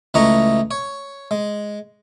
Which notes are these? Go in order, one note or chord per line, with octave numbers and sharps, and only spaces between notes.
C#2 E3 A3 D#5 A#5 C#6
C#5
G#3